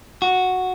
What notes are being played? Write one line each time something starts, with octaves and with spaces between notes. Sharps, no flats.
F#4